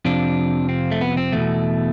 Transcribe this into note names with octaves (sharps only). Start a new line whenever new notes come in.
F2 C3 F3 D4
C4
A3
B3
C4
E2 B2 A3